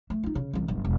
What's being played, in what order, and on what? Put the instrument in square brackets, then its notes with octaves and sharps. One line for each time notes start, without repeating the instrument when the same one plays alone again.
[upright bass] A3
D#4 F4
C#3
C2 E3
D1 G1
E1